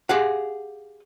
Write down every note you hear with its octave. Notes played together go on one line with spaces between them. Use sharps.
G4 G#4 F5 F#5